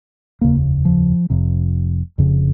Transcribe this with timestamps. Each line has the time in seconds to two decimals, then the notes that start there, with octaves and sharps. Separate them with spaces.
0.41 F1 D#2 C#3 A#3
0.85 F3
1.30 F1 F2 C3
2.18 F1 F2 C#3